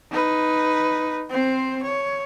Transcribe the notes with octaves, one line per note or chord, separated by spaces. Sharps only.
D#4 B4
C4 C5
C#5